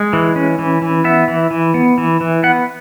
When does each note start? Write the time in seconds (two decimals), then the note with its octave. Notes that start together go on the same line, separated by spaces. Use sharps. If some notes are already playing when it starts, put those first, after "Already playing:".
Already playing: G#3
0.13 E3
0.36 C#4
0.59 E3
0.82 E3
1.04 B3 E5
1.28 E3
1.51 E3
1.74 B3
1.98 E3
2.21 E3
2.43 B3 F#5